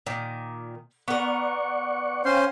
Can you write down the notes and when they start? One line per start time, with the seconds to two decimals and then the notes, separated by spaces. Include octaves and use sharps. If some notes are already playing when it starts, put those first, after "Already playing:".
0.06 A#2 D#3
1.08 B3 A#4 D5 F#5 C#6
2.25 C#4 C5 F5 G5 C6